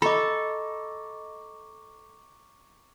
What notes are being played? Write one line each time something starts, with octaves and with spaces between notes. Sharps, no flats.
A4 D#5 A#5 B5 C#6 D6